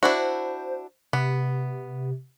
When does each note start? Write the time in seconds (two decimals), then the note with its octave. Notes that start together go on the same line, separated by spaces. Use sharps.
0.03 D4 E4 F#4 C5
1.13 C3 B3